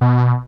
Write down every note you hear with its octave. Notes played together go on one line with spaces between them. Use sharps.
B2